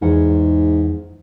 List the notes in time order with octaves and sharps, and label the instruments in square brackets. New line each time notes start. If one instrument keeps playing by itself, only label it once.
[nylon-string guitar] E2 F#5 [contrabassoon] G#2